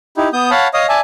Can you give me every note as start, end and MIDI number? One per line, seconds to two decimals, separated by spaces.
0.17 0.29 63
0.17 0.29 64
0.17 0.29 67
0.33 0.50 59
0.33 0.50 87
0.33 0.50 91
0.51 0.68 73
0.51 0.68 77
0.51 0.68 78
0.51 0.68 81
0.51 0.68 83
0.74 0.87 73
0.74 0.87 75
0.74 0.87 77
0.74 0.87 87
0.89 1.01 74
0.89 1.01 76
0.89 1.01 80
0.89 1.01 81